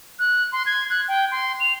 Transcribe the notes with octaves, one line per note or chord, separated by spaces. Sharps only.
F#6
C6
G#6
F#6
G5
C6
F7